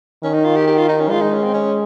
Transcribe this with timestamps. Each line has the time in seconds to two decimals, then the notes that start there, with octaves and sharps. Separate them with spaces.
0.23 D#3 C#4
0.34 D#4
0.45 F4
0.56 G4
0.67 G4
0.77 F4
0.89 D#4
1.00 C#4
1.10 G#3 F4
1.21 D#4
1.33 C#4
1.44 C4
1.54 C#4